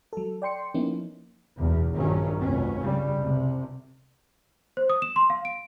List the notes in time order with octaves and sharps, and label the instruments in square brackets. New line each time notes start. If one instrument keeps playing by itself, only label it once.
[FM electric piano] F#3 A4
D5 G5 C6 C#7
F3 A#3 B3 C#4 D#4 E4
[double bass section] F#1 B1 E2
A#1 G2 D#3 F#3 C#4
F1 C2 B2 C#4
C#3 G3
C2 C3
[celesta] C5
D#6
E7
C6
F5
D7